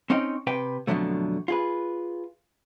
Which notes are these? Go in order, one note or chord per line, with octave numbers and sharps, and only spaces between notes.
C4 C#4 D#4 D#5 G5
C3 B4 G5
F2 B2 D3 F3 F#3 A3
F4 G#4 B4